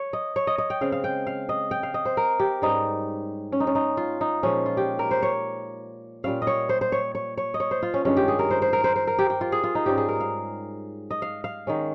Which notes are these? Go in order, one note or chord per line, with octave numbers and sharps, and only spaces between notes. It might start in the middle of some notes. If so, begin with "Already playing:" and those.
Already playing: C#5
D#5
C#5
D#5
D#5
G5
C#3 G#3 C4 F5
F5
G5
F5
D#5
G5
F5
D#5
C5
A#4
G4
G#2 G3 C#4 D#4
C#4
D#4
C#4
D#4
F4
D#4
A#2 F3 G#3 C#4
F4
G4
A#4
C5
C#5
A#2 G3 C#4 F5
D#5
C#5
C5
C5
C#5
C#5
C#5
D#5
C#5
C5
F4
C#4
G2 D#3 G#3 C#4
G4
G#4
A#4
C5
C5
A#4
C5
C5
A#4
G4
G4
F4
G#4
F4
D#4
G#2 G3 C#4 G4
G#4
A#4
F5
D#5
F5
F5
D#3 G#3 C#4